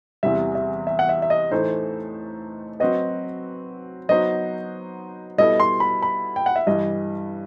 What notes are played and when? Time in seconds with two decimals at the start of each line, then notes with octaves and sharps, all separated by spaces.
0.23 E2 C3 E3 G3 E5
0.55 E5
0.87 E5
0.99 F#5
1.09 E5
1.22 E5
1.30 D#5
1.51 A2 E3 A3 D#4 A4 C5
2.80 F#3 C4 F#4 B4 D#5
4.09 F#3 B3 D#4 F#4 C5 D#5
5.38 B2 G3 B3 E4 A4 D#5
5.60 C6
5.80 B5
6.02 B5
6.36 G5
6.46 F#5
6.56 E5
6.67 G2 E3 G3 D#5